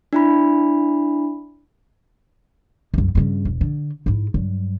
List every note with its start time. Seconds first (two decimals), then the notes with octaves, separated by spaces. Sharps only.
0.13 D4 E4 B5
2.94 C2 F#2
3.15 G2 C#3
3.45 E1
3.61 D3
4.06 G#2 E4
4.34 G2 F#3